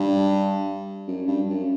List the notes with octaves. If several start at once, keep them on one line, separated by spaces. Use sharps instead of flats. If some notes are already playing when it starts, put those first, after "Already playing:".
Already playing: G2
F#2
G2
F#2